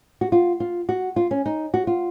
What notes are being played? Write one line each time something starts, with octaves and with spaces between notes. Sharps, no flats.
F#4
F4
F4
F#4
F4
C#4
D#4
F#4
F4